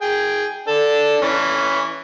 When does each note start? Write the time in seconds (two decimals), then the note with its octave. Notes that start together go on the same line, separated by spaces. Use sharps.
0.02 G#4 G5
0.68 D4 A4
1.22 E3 C#4